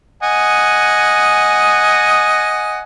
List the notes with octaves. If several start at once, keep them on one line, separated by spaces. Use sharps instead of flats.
D#5 F#5 G#5